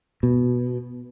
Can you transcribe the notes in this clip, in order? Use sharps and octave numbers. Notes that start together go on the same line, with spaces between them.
B2